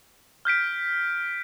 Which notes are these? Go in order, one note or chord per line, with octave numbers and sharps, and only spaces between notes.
F6 G6 B6 D7